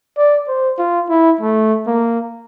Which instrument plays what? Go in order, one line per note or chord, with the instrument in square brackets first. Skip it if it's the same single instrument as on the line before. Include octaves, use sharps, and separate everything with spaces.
[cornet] D5
C5
F4
E4
A3
A#3